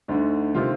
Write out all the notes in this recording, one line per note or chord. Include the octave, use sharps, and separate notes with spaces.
D2 D3 D#4
C3 D#3 F4